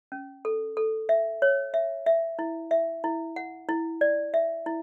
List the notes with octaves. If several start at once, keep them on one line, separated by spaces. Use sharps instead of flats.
C#4
A4
A4
E5
C#5
E5
E5
E4
E5
E4
F#5
E4
D5
E5
E4